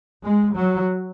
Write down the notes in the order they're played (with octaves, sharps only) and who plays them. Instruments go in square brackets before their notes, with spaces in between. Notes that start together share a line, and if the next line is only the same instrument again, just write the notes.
[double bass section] G#3
F#3